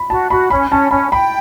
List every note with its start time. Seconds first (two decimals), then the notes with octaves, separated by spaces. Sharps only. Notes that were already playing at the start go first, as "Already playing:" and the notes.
Already playing: B5
0.10 F#4 A5
0.30 F#4 B5
0.50 C#4 B5
0.71 C#4 A5
0.91 C#4 B5
1.11 G5 B5